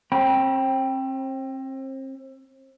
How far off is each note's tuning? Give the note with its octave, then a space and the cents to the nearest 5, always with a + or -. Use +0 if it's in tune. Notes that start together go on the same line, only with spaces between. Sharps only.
C4 +35 G5 +0 B5 -35